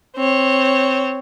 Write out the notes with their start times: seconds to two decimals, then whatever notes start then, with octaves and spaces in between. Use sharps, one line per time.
0.16 C4 C#5